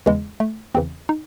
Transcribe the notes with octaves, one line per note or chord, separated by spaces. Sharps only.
E2 C#3 E3 G#3
A3
E2 C#3 E3 C4
D#4